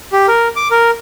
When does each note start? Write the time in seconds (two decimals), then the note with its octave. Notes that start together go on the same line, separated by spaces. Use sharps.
0.13 G4
0.28 A#4
0.56 D6
0.71 A#4